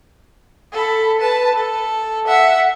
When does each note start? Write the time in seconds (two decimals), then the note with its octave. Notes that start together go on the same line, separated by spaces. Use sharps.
0.72 A4 B5
1.20 B4 A5
1.54 A4
2.27 E5 F#5